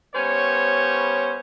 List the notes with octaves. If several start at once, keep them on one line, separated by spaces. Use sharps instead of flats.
G3 B3 C#4 C5 C#5